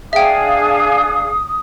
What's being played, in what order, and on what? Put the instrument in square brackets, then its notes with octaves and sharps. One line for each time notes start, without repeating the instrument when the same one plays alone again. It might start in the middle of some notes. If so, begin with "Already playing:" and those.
[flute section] D4 G#4 F5 [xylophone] E5 G5 [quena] D#6